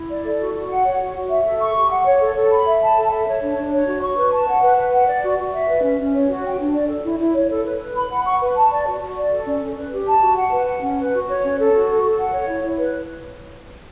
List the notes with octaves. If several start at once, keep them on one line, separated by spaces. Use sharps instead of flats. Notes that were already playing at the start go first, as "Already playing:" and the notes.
Already playing: E4
D5
A4
F#4
F#4
F#5
C#5
F#4
F#4
E5
A4
C#6
G4
F#5
C#5
A4
A4
B5
E5
A5
A4
E5
C#5
D4
D4
C#5
F#4
C#6
B4
A5
F#5
B4
B4
F#5
D5
F#4
F#4
E5
B4
C#4
C#4
C#5
F#4
G5
D4
D5
A4
E4
E4
C#5
A4
B4
B4
B5
F#5
C#6
B4
A5
D5
F#4
F#4
D5
A4
C#4
C#4
B4
G4
A5
F#4
F#5
B4
F#5
C#4
B4
F#4
C#5
C#4
A4
F#4
A4
A4
F#5
C#5
E4
E4
B4